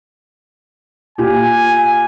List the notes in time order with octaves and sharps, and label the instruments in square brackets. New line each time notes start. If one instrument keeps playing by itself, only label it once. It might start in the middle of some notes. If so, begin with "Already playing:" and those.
[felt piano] A#2 G4 [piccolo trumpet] G#5